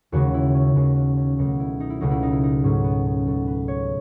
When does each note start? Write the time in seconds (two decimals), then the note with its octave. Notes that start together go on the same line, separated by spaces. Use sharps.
0.12 D#2 C#3 G#3 F#4
0.34 E4
0.55 C#4
0.75 D#2 C#3 G#3 B3
0.96 C#4
1.17 C#4
1.38 C#2 B2 F#3 A3 D#4
1.60 E4
1.80 D#4
1.90 E4
2.01 C#2 B2 F#3 A3 D#4
2.11 E4
2.23 D#4
2.32 E4
2.43 D#4
2.63 G#2 F#3 A3 C#4
2.84 B3
3.06 C#4
3.26 G#2 F#3 A3 A4
3.47 B4
3.68 C#5